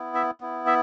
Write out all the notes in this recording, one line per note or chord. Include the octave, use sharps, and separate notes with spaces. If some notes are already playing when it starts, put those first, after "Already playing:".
Already playing: B3 E4
E5
B3 E4
E5